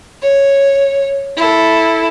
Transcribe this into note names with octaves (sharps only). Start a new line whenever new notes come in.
C#5
E4 A4